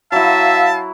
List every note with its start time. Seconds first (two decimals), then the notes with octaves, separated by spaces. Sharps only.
0.12 F#3 E4 E5 F5 A5